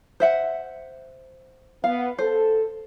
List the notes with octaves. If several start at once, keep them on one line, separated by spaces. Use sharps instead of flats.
C5 E5 F#5
B3 F5
A4 C5